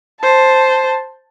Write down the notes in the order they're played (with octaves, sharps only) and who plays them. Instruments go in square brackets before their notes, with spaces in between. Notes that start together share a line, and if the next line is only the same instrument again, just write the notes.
[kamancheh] C5 A5